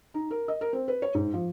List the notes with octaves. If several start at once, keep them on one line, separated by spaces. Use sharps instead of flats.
D#4
A#4
D#5
A#4
C4
B4
C#5
G#2
F3